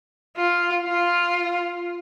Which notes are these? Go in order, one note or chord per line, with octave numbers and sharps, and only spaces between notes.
F4
F4